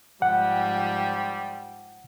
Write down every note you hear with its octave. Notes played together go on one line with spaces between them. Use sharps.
G#2 F3 G3 F#5 G5